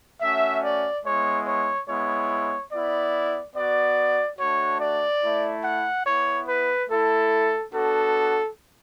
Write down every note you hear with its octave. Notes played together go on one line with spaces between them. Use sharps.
A3 C#4 F#4 E5
D5
G#3 B3 E4 C#5
C#5
G#3 B3 E4 C#5
B3 E4 D5
B3 F#4 D5
A3 D4 F#4 C#5
D5
A3 E4
F#5
B3 E4 C#5
B4
A3 E4 A4
B3 D4 F#4 A4